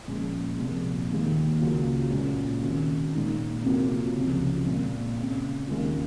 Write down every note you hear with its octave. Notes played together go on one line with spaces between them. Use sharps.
A#2 F3 G#3 C#4
C2 A#2 F3 A#3
D#2 D#3 G#3 D#4
C#2 C#3 F#3 A#3 F4
A#2 G#3 C#4 F4
C3 D#3 G#3 C#4 F#4
A#2 G#3 D#4
F2 C3 F#3 A#3 F4
C#2 C3 F3
A#2 G#3 C4
C#3 G#3 C4
D#2 D#3 G#3 C#4 F4